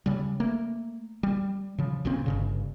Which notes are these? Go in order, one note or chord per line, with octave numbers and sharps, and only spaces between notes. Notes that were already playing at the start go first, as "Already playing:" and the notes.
C#3 G3
A3 A#3
G3
C#3 F3
B1 A#2 C#3 C4
G1 G2 C#3